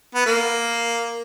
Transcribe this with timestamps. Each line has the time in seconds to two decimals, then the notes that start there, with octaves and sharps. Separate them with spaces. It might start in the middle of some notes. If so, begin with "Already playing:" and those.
0.15 B3
0.26 A#3